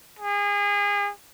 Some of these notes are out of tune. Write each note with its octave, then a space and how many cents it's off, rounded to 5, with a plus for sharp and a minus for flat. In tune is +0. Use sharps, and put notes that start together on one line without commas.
G#4 -30